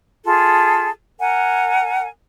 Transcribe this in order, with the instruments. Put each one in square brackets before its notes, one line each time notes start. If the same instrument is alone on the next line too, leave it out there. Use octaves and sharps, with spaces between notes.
[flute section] F4 G#4 A4
A#4 F#5 G#5